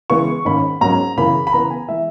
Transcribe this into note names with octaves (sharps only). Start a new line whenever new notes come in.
C#3 E3 G#3 B3 C#6
G#2 D#3 A#3 C#4 B5
G#2 F#3 A#3 C#4 A#5
F#2 C#3 E3 A#3 B5
B5
C#3 E3 B3 A#5
G#5
E3 G#3 E5